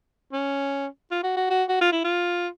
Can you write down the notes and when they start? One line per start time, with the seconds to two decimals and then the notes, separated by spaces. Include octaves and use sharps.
0.33 C#4
1.11 F4
1.24 F#4
1.37 F#4
1.50 F#4
1.69 F#4
1.81 F4
1.92 E4
2.05 F4